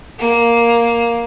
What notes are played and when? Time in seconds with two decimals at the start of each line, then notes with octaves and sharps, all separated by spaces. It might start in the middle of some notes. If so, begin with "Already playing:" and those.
0.18 A#3